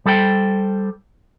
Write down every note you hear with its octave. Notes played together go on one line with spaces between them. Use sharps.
G3 A4 C5 G5